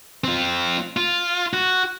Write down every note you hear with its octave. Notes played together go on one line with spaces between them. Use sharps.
C4 F4
F4
F#4